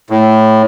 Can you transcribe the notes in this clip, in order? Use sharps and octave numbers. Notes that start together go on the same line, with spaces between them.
A2